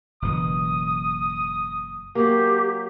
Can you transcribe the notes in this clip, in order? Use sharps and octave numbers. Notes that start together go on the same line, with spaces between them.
F#1 B2 E3 D#6
F#3 A#3 G4